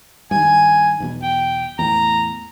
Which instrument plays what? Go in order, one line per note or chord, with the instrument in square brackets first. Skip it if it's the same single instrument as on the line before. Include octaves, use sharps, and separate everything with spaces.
[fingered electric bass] G2 D#3 [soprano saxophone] G#5
[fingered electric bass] B1 E2 B2
[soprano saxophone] G5
[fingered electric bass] E2 A2 [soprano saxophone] A#5